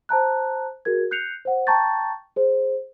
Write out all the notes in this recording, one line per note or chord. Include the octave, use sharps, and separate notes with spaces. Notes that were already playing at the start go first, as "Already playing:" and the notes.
C5 A5 A#5 F#6
F#4 G#4 A#4 G#6
F#6 G6 C7 C#7 F7
C5 F#5
G5 A5 A#5 C#6 G6 A6
G#4 C5